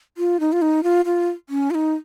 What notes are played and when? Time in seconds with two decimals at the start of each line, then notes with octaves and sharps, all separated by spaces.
0.18 F4
0.40 D#4
0.52 F4
0.62 D#4
0.83 F4
1.05 F4
1.49 C#4
1.71 F4
1.75 D#4